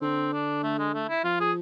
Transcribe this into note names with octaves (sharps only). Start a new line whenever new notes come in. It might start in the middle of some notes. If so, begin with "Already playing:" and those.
D3 C4
D4
A3
G#3
A3
E4
F3 F4
G#4